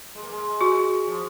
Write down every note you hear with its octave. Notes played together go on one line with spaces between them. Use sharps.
G#3
A#3
G#3
F#4
F3